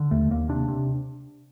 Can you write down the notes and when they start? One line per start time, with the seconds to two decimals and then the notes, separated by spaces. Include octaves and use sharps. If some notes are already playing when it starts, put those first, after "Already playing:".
Already playing: D3
0.11 D#2 A3
0.30 D#2 A#3
0.49 C3 D4
0.68 C3